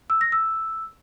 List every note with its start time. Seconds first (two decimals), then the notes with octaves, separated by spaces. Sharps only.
0.10 E6
0.21 A#6
0.32 E6